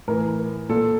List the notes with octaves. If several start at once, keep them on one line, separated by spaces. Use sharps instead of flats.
A2 E3 A#4
A#2 A4